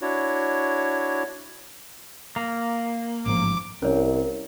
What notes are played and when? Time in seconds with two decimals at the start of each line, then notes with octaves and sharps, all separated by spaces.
0.02 D4 E4 F#4 C#5
2.36 A#3
3.26 A1 G#2 F3 D6
3.82 C2 C#4 A#4 C#5